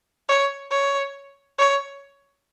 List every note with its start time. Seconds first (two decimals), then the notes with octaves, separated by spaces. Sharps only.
0.29 C#5
0.71 C#5
1.58 C#5